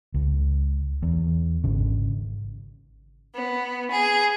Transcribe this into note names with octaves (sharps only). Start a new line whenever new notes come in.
C#2
E2
G#1 C#3
B3
G#4